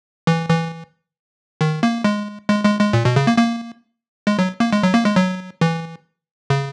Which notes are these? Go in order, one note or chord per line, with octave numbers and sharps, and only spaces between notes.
E3
E3
D#3
A#3
G#3
G#3
G#3
G#3
A#2
B2
C#3
A#3
A#3
G#3
F#3
A#3
G#3
F#3
A#3
G#3
F#3
E3
C#3